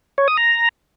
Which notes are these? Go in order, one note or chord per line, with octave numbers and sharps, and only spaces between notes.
C#5
D#6
A#5